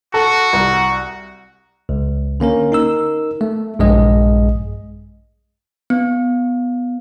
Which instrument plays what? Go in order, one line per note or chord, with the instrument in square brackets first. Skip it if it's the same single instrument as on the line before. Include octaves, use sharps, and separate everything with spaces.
[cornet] F#4 [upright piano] A4
[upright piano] C2
[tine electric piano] C#2
D3 A#3 C#4 A#4
D#4 A#4 E6
A3
A#1 G2 G#3 G#4 D#5
[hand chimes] B3